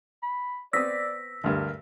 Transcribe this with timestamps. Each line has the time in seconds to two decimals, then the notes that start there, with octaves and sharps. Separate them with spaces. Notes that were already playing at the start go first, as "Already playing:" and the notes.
0.23 B5
0.73 B3 C4 D5 D#6 E6 A#6 B6
1.44 D2 G2 D3 A#4